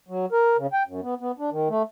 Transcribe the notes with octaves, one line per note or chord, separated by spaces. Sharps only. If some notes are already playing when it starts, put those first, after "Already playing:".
F#3
A#4
C#3
G5
F#2
B3
B3
D4
D#3
A3